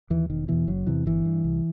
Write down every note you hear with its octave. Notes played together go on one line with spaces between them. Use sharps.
D#2 E3
E1 D#3
E2 B2 E3
F#1 F#3
E2 C3 E3
G1 E3
G2
C2